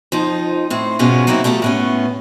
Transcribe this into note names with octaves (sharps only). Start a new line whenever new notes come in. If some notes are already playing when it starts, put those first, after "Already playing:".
F2 F3 D#4
A2 C4
G#2 B2 G#3 B3 C#4 F4
F#3 A#3 C4 D#4 E4
B2 A3 E4 F4 G4
A2 B3 C#4